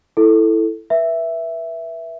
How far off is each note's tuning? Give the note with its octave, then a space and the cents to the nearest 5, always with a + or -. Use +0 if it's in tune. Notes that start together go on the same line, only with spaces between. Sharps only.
E4 +0 A4 +0
B4 -30 E5 +0